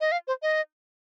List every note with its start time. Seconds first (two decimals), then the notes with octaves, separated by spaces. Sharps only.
0.01 D#5
0.12 F5
0.27 C5
0.42 D#5